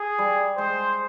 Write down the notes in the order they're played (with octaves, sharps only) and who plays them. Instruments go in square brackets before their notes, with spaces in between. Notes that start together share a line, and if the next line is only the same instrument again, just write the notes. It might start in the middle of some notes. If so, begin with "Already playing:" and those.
Already playing: [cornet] G#4
[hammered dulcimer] G3
[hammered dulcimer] G#3 [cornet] C5